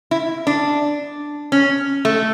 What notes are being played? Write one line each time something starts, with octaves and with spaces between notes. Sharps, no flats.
E4
D4
C#4
A3